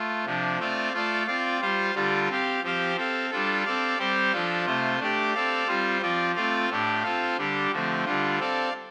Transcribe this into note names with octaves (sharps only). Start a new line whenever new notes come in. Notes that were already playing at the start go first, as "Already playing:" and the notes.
Already playing: A3 F4
C3 F3 D4
A3 C4 F4 D5 F5
A3 F4 A4 D5 F5
C4 F4 D5 F5
G3 F4 C5 F5
D3 G3 F4 D5
C4 G4 F5
F3 C4 G4 C5 F5
C4 A4 F5
G3 D4 F4 A4
C4 A4 D5 F5
G3 C4 G4 C5
F3 D4 F4 A4
C3 A3 F4 C5
A3 D4 G4 D5
C4 A4 D5 F5
G3 C4 F4 C5
F3 C4 F4 D5
A3 C4 F4 D5 F5
A2 A3 D4 G4
C4 F4 A4 F5
D3 G3 D4 G4
D3 F3 A3 C4
D3 G3 D4 F4
C4 A4 D5 F5